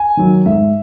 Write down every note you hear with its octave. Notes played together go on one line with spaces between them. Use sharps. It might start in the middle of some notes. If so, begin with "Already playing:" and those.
Already playing: G#5
D#3 F#3
G#2 E5